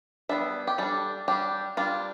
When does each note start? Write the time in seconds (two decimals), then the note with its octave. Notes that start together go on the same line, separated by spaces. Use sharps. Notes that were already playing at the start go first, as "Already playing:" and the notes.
0.29 G3 B3 D4 E5
0.67 G4
0.78 G3 D4 A4
1.28 G3 D4 G4
1.77 G3 D4 F4